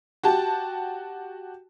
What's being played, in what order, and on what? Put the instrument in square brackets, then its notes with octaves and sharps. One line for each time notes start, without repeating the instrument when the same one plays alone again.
[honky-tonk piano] F#4 G4 A5